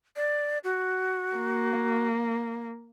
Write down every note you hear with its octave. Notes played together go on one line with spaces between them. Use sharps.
D5
F#4
A#3